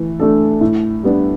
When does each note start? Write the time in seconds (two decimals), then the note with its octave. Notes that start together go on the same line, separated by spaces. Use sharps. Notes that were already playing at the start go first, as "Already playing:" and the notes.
Already playing: E3 A3
0.20 A3 D4 A4
0.61 A2
1.03 G3 B3 D4